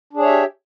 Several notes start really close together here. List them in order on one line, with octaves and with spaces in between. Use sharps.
D4 G#4 C#5 E5 G4